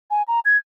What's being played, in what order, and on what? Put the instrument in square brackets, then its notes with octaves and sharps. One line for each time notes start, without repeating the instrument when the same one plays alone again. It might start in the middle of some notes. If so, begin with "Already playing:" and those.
[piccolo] G#5
A#5
G#6